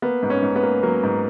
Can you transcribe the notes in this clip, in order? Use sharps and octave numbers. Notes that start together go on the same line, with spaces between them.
A#3 B3
G#2
C#4
G#2
B3
A#3
F#3 A#3
G#2